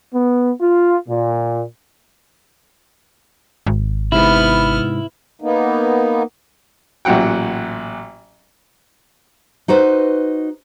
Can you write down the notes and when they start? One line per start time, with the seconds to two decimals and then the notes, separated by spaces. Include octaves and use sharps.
0.13 B3
0.60 F4
1.08 A#2
3.67 G#1
4.12 G#2 C3 B3 E4 F6
5.42 A#3 B3 D#4
7.05 A1 A#2 F#3 F#5 G5
9.68 D#4 F#4 B4 C5